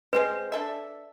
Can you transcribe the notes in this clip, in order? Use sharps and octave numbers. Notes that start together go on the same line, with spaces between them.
G#3 C4 B4 C5
D4 A4 E5